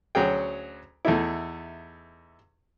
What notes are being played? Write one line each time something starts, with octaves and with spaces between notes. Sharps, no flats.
D2 F#3 C#4 G#4 G5
E2 A3 D#4 E4